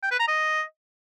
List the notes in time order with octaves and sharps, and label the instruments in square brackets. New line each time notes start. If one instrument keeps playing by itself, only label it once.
[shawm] G5
B4
A#5
D#5